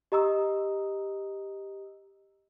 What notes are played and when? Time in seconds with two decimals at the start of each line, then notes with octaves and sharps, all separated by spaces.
0.12 G4 D#5 A#5 D#6 E6